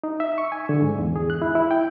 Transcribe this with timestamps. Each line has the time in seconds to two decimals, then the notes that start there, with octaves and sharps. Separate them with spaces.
0.04 D#4
0.20 E5
0.38 C#6
0.52 G#5
0.69 D3
0.82 G#2
0.98 E2
1.16 G#4
1.30 F#6
1.42 E4
1.55 E4
1.71 G5